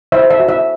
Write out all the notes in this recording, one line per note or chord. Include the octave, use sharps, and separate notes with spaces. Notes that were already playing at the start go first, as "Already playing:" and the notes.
C5 E5
E5
F#4
E5